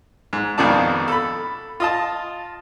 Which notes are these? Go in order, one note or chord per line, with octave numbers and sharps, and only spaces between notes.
G#2
A#1 F2 B2 D#3 D5 A5
A4 B5
F4 D#5 A5